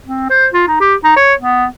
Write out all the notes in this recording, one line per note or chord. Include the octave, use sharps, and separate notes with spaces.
C4
C5
F4
D#4
G4
D#4
C#5
B3